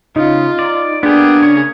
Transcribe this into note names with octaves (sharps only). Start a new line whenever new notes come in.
C#3 D#4 F4
D5
A#3 B3 D4 G4 G#4
C#3 C#5